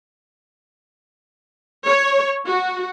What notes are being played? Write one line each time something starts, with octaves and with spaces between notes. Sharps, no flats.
C#5
F#4